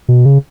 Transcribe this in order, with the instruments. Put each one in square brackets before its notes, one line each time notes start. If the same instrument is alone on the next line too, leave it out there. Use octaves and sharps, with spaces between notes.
[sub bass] B2
C#3